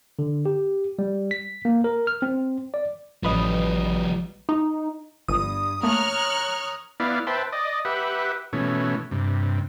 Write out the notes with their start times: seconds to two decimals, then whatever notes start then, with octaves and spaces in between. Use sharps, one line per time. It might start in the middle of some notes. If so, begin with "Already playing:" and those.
0.19 D3
0.46 G4
0.99 G3
1.31 B6
1.65 A#3
1.84 A#4
2.07 F6
2.22 C4
2.74 D5
3.23 A1 F3 G3 B4 D#5
4.49 D#4
5.28 G1 G2 D#6
5.83 A3 A#3 A#4 C#5 C#6 F6 F#6
7.00 B3 E4 D5 F5
7.27 B4 C5 E5 G5 A5
7.52 D5 D#5
7.85 G4 B4 E5 F#5
8.53 B2 E3 A3 C#4
9.11 G2 C3